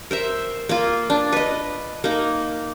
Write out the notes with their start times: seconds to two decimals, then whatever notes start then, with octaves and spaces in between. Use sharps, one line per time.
0.11 A#4 C5 E5
0.69 A#3 F4
1.10 D4
1.32 B4 D#5
2.04 A#3 D#4 A#4